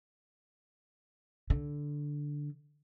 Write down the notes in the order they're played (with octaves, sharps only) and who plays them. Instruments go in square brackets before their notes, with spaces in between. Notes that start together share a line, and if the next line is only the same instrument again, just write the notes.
[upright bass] D3